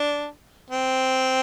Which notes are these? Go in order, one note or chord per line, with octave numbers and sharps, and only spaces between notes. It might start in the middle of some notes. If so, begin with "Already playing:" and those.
Already playing: D4
C4